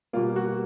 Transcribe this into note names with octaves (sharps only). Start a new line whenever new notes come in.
B2 G3 A#3 F4
F#4